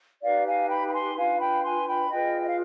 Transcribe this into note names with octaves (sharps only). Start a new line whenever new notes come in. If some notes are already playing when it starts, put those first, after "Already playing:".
D#4 G4 B4 D5 F5
F5 G#5
G5 B5
B5
G#5 C6
D4 F4 B4 F5 G#5
G5 B5
G#5 C6
G5 B5
F4 G#4 B4 D#5 G5
D#5
F5